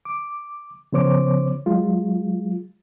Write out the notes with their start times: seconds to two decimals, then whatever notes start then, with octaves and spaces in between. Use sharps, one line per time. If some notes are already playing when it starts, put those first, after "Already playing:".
0.05 D6
0.93 C#3 F3 B3 C5 C#5 D6
1.66 F#3 G#3 F4